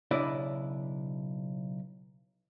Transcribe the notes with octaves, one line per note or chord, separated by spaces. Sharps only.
B1 C#3 D4 E4 D5 D#5